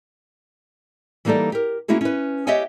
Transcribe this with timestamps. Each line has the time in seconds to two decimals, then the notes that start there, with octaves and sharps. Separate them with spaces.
1.25 E3 G3 A#3 D#4 A4 D5
1.52 G4 A#4
1.88 A#3 C#4 E4 F#4 G#4
2.01 C#4 B4
2.47 G4 C#5 D#5 E5 F#5 G#5